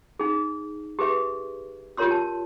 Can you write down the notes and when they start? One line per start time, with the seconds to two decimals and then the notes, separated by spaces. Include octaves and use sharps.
0.20 D#4 G#4
0.99 G4 G#4 B4 E5
1.97 F4 G4 A#4 C#5 C6 E6
2.11 A5